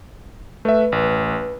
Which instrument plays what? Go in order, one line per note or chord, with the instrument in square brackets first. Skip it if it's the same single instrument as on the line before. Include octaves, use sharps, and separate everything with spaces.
[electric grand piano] A3 E5 [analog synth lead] B4
[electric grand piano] A1